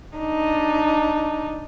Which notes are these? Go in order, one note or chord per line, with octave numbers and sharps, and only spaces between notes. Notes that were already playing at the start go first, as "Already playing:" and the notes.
D4 D#4